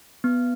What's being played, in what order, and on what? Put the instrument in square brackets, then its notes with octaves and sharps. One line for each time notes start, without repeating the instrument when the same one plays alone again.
[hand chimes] B3